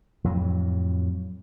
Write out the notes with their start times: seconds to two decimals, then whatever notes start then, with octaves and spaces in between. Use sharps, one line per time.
0.24 F2 A2 F#3